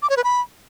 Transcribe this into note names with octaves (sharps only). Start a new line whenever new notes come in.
D6
C#5
B4
B5